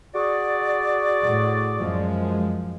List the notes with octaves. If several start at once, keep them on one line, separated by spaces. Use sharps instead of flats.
F#4 G#4 D5
A2
F#2 F3 G#3